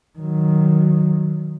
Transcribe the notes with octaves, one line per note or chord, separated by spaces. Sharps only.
D#3 F#3